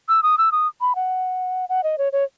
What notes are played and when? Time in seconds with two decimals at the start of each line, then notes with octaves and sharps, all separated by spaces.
0.09 E6
0.23 D#6
0.38 E6
0.52 D#6
0.81 B5
0.95 F#5
1.69 F#5
1.84 D#5
1.98 C#5
2.13 C#5